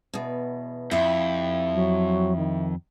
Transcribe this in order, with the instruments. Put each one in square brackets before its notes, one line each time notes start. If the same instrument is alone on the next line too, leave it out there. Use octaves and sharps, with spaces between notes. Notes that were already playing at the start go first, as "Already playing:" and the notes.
[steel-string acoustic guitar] E2 B2
[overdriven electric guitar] F2 [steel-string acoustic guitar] E4 G4
[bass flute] F#3
D#3